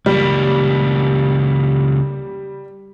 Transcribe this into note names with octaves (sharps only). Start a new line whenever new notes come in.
C#2 G3 A#3